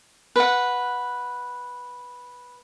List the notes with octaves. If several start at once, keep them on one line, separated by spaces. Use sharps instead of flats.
B4 F#5